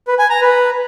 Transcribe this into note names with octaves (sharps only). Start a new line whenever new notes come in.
B4
G#5
A#5
B4